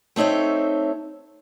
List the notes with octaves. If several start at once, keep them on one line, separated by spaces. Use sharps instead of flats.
A3 C4 D#4 C#5 E5